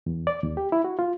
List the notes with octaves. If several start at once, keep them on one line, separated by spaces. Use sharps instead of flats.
E2
D5
D#2
G4
E4
F#4
F4